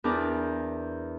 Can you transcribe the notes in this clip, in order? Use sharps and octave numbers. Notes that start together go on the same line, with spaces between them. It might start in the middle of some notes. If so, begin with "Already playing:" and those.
E2 D4 A#4 D5